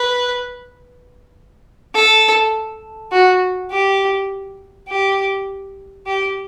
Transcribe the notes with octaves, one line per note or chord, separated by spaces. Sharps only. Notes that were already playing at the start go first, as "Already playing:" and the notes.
Already playing: B4
A4
F#4
G4
G4
G4